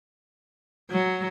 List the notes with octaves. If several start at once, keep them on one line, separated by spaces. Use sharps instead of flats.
F#3